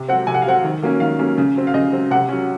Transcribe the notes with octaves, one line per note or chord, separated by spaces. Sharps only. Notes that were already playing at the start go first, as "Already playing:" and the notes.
Already playing: C3
F#3 C4 F#5
C3 G#5
F#5
F5
F#3 C4 F#5
D#3
F#3 A#3 C#4
D#3 F5
F#3 A#3 C#4
C#3
F#3 C4
F5
C#3 D#5
F#3 C4
C3 F#5
F#3 C#4